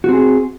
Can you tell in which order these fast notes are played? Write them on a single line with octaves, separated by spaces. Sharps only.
F#4 C4 G#4